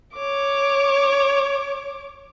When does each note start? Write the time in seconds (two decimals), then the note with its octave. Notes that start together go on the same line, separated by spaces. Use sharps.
0.15 C#5 D6